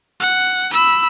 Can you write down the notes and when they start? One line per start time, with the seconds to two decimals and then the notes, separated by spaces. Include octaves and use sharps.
0.20 F#5
0.72 B5 E6